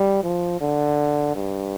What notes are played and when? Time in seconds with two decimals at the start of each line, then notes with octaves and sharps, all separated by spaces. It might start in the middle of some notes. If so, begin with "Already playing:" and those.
Already playing: G3
0.24 F3
0.61 D3
1.35 G2